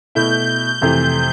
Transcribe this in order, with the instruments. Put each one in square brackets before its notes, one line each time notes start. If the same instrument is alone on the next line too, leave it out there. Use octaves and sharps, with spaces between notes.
[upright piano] B2 A3 E4 [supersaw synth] G6
[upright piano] F2 C3 E3 A3